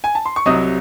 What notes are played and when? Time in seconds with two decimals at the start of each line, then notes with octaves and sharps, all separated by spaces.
0.04 G#5
0.15 A5
0.26 C6
0.36 C#6
0.46 C2 C3 F#3 D#5 D#6